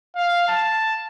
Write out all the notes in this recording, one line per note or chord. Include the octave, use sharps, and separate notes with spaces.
F5
A5